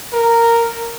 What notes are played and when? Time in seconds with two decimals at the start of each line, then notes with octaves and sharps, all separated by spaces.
0.13 A#4